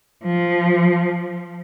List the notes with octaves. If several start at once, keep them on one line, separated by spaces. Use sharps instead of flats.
F3